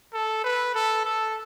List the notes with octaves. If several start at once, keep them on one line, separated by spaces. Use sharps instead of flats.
A4
B4
A4
A4